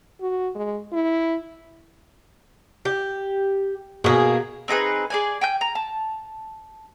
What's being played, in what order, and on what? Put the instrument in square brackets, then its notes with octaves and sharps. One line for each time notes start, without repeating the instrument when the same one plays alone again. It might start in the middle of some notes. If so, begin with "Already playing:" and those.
[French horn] F#4
G#3
E4
[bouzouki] G4
[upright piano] B2 [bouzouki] A#3 G#4
[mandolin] C4 D#4 G#4 B4
G#4 D5 G#5
G5 G#5 G6
A#5
A5